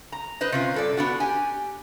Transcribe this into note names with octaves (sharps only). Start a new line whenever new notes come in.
A#5
B4 C5 D#5
C3 C#4 F4
G2 A4 D5
B3 D4 F#4
G4 G#5